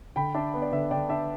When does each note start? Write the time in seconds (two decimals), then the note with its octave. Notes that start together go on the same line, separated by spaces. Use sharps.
0.16 D3 G5 B5
0.34 D4 E5 A5
0.54 B3
0.62 D5
0.72 D3 B4 E5
0.91 D3 D5 G5
1.09 D4 E5 A5